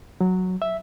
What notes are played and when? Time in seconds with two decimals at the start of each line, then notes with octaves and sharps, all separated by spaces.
0.21 F#3
0.62 E5